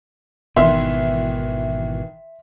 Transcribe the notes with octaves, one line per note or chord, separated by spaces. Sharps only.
G#1 B2 D#3 E3 E5 C6